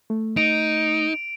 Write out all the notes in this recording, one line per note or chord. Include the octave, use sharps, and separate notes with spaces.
A3
D#4 D7 F7